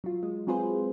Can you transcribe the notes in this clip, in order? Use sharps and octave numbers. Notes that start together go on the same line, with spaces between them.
F#3 F4
G#3
F#3 C4 F4 G#4 B4 C5